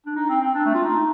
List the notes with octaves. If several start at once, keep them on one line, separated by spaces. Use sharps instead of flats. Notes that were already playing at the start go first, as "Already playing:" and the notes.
D4
D#4
C4
C4
D4
A3
F4
D#4